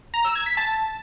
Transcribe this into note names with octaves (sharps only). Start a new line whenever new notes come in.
A#5
E6
G#6
B6
A5